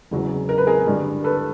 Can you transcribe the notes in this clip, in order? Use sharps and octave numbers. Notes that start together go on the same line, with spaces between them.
E1 E2 C#3 F#3
A#4
B4
G#4 A#4
G2 D3 G3
A4 B4